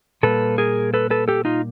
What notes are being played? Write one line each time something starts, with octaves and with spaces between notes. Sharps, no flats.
A#2 G3 A#3 A4 B4
G#4 A#4
A4 B4
A4 B4
G4 A4
D#4 F4